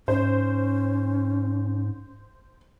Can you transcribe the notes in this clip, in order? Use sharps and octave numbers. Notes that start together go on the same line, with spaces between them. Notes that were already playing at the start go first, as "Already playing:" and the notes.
G#2 C#4 C5